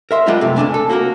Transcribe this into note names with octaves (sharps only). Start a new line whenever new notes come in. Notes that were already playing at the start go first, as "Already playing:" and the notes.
A#4 E5 C6
F3 G3 G#3 B3 D#4 F4
F#2 C3 A3
C#2 G2 D4 G#5
A4
A#3 F#4 G#4 A#4